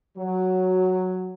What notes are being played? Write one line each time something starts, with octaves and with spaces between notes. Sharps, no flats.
F#3